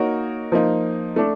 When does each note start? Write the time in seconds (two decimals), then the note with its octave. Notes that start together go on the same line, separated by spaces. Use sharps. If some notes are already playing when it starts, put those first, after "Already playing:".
Already playing: A#3 D#4 F#4 A#4 C#5
0.52 F3 A#3 D#4
1.16 A3 D4